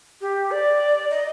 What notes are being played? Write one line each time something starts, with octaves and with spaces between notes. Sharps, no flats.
G4
D5
D#5